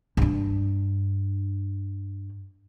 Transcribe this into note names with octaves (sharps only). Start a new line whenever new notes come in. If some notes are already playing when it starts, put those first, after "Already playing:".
G2 D4